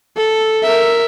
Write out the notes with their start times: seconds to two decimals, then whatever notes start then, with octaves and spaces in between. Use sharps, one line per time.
0.16 A4
0.63 A#4 E5